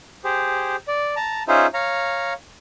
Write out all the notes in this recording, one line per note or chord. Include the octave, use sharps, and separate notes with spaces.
G4 G#4 C5
D5
A5 A#5
C#4 D#4 F4 G#4 C5 E5
C#5 F5 A#5